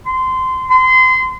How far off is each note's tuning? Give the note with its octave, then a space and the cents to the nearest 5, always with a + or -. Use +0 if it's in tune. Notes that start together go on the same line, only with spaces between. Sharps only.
C6 -20
C6 -30